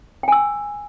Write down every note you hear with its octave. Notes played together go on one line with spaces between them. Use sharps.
G5 G#5 E6